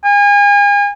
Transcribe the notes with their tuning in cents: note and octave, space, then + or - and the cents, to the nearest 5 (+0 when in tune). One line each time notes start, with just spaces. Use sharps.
G#5 -35